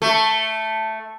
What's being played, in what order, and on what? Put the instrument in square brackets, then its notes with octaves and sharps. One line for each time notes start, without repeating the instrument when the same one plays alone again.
[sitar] A3